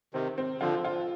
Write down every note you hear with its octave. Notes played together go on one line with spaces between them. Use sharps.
C3 D#3 C4
C4
D3 F3 F4
F4